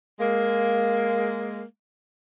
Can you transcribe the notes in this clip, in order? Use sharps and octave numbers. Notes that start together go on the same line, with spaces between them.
G#3 A#3